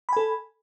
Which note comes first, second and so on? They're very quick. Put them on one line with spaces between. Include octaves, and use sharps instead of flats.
B5 G#5 A4